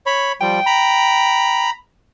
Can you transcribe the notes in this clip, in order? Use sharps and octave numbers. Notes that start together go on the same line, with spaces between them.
C#5 B5
F3 G3 G5
A#5 B5